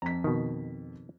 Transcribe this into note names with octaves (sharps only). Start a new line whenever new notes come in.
F2 A#5 B6
B2 D#3